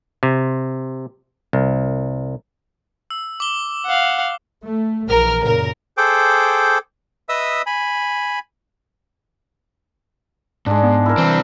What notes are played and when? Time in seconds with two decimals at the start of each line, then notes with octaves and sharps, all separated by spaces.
0.23 C3
1.53 C2
3.10 E6
3.40 D6 G7
3.86 F5 F#5
4.64 A3
5.09 A#1 E3 A#4 F6
5.42 F#2 A#2 C#3 A#4
5.98 G#4 A4 C5 G5 D6
7.29 B4 D#5 E5 D#6 E6
7.66 G#5 B5
10.66 G#2 G#3 D4
10.83 B3
11.06 E4 A#4
11.18 C2 E3 C4